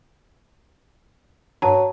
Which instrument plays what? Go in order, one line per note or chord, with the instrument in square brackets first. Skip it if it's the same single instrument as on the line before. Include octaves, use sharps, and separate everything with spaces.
[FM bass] G2 [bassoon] F#3 [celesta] A5 A#5